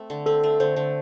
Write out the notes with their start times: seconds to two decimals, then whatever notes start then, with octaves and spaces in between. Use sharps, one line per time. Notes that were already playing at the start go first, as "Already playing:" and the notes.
Already playing: A3 C4
0.10 D3
0.26 C4 A4
0.44 A3
0.60 D3 C5
0.76 D3